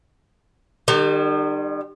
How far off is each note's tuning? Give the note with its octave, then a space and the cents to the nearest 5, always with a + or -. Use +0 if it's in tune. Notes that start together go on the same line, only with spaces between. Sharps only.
D#3 -40 G3 +15